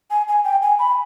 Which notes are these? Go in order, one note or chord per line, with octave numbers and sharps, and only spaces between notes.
G#5
G#5
G5
G#5
B5